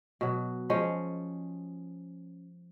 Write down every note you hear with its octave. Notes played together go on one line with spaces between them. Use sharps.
B2 F#3
F3 G#3 C#4